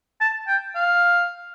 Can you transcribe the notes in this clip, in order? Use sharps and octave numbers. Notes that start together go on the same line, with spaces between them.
A5
G5
F5